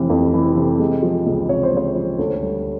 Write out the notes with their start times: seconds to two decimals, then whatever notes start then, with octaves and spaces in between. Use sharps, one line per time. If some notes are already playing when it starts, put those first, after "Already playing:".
Already playing: F1 C3 E3
0.10 F2
0.34 E3
0.57 C3
0.79 G#3
1.02 F3
1.26 C#2
1.49 C3 C#5
1.63 C5
1.72 G#3 C#5
1.96 F3
2.19 D2
2.42 G3